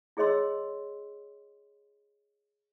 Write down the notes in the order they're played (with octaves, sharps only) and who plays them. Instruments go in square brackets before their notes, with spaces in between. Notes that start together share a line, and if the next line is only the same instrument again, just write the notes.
[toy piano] E4 G#4 C#5 D#5 C6 E6